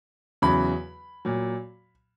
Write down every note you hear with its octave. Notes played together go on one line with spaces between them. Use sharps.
E2 C#3 F#3 B5
A#2 F#3